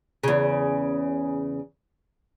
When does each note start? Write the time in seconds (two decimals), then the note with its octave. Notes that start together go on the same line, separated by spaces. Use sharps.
0.23 E2 C#3